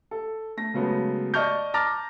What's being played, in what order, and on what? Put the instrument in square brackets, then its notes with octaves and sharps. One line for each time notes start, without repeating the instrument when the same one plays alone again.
[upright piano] A4
A3 A#6
C#3 F#3 G#3 A3 B3
D5 D#5 A5 C#6 F6 G6
A5 A#5 D6 F6 A6 A#6